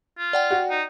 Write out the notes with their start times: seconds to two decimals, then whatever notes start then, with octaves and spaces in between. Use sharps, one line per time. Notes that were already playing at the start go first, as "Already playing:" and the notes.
0.18 F4
0.33 D5 F#5 G5
0.51 F#4
0.71 D#4